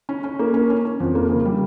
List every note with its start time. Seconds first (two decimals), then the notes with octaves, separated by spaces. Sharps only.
0.09 C#4
0.24 C#4
0.39 A#3
0.54 C#4
0.70 C#4
0.85 C#4
1.00 F2
1.15 A#3
1.29 C#3
1.45 G3